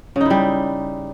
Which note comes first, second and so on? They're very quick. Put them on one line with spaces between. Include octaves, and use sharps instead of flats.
C#3 D#4 E4 G3